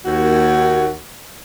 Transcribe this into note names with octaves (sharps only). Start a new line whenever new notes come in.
D#2 F#4